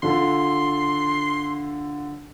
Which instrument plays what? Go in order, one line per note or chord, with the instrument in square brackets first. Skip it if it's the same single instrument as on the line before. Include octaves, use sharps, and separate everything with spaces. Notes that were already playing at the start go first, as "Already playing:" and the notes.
[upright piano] D3 F4 A4 [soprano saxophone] C6